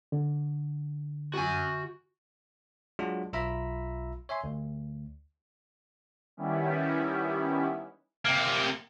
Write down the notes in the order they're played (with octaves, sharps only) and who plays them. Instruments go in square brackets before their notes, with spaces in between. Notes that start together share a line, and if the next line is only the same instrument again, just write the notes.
[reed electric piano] D3
[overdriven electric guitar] F#4 G#5
[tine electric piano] F#3 G#3 D4 F4 F#4
B1 F4 E5 A#5 B5 E6
C#5 E5 G#5 C6
D2
[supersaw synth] D#3 G3 B3 C#4 E4
[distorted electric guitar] C3 A#3